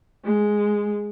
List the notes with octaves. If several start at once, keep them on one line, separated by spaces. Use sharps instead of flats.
G#3